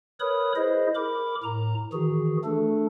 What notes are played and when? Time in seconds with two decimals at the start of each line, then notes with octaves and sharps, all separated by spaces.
0.20 A#4 B4 C#5 B5 D#6
0.56 E4 G#4 C5 D#5
0.95 A#4 B5 D6
1.44 A2 A#5
1.93 D#3 E3 F#4 G#4
2.44 A3 D4 A4